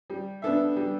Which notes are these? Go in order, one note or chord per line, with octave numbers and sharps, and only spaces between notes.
G3
B3 D4 A4 E5
G3